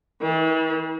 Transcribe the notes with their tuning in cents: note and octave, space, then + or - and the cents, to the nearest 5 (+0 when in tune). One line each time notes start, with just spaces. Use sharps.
E3 -40